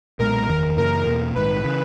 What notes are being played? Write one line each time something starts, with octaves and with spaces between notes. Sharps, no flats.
B1 A#2 G#3 B3 A#4
F#1 E2 D#3 A#4
F#2 C#3 E3 A#3 A#4
E2 B2 A#3
A#1 G#2 D#3 B4
C#3 E3